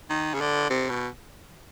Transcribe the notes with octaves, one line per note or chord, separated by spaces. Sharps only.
D#3
C#3
D3
C3
B2